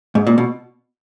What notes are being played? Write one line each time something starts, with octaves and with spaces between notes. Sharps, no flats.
G#2
A#2
B2